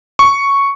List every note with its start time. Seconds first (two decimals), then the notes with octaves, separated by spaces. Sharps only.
0.19 C#6